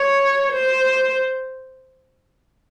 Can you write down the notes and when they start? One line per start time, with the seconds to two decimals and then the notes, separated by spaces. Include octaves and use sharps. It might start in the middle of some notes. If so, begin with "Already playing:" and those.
Already playing: C#5
0.53 C5